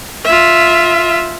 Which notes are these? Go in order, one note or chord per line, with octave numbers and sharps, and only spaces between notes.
F4 E5